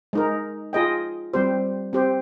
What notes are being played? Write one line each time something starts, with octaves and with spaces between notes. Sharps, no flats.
G#3 D#4 A#4
F4 G#4 D#5 G5
G3 C4 G4 C5
C4 G4 C5